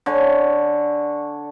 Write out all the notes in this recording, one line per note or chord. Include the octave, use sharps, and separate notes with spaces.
D3 C#5 G#5